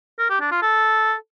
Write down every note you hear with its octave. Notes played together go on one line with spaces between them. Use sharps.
A#4
G4
D4
F4
A4